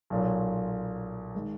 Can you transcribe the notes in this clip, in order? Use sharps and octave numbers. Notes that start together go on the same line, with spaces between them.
B1 A#2 F#3
D#3 G#3